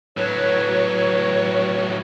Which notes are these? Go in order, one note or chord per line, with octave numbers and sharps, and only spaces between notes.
A2 F#3 B4 C#5